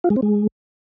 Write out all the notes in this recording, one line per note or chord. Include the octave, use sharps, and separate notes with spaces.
F4
G#3
C4
G#3